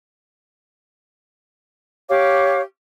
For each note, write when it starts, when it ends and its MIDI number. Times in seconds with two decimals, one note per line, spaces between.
2.09 2.60 67
2.09 2.60 73
2.09 2.60 77
2.09 2.60 86